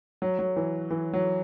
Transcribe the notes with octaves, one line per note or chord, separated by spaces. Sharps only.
F#3
F#3
E3
E3
F#3